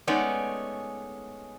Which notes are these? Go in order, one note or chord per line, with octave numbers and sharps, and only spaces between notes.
G#3 A3 B3 C#4 D#4 D5